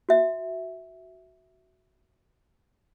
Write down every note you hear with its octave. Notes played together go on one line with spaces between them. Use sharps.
F#4 E5